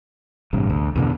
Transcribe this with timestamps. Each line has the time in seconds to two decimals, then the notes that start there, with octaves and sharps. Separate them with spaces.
0.53 A1 G2 C3
0.70 D2
0.96 E2 B2 D3